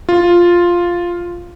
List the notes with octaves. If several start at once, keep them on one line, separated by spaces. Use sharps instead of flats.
F4